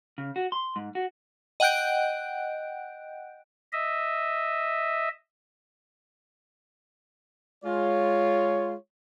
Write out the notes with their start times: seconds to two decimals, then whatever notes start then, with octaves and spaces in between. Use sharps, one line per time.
0.18 C#3
0.36 F#4
0.52 C6
0.76 G#2
0.95 F#4
1.60 D#5 F#5 G5 F#6 G6 D7
3.73 D#5 E5
7.64 G#3 F4 C#5